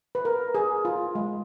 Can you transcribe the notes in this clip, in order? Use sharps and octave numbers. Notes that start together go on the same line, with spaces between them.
B4
A#4
G#4
F4
G#3